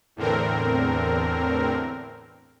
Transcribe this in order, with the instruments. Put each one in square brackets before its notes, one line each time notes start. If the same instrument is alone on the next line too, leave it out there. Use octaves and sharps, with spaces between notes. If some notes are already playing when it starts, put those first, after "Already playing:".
[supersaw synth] E2 A2 D3 C4 A#4